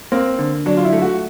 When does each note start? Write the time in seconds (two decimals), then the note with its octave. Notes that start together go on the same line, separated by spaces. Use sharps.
0.12 A#3 C4
0.39 D3
0.66 F#3 D4
0.77 F4
0.84 E4
0.93 A3
1.02 F#4